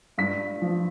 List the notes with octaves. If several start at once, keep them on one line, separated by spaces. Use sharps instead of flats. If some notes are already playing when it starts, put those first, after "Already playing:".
G2 B6
F3